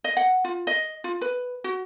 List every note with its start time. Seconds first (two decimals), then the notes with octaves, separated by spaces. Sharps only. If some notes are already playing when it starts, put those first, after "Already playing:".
0.04 D#5
0.17 F#5
0.44 F4
0.67 D#5
1.04 F4
1.21 B4
1.64 F#4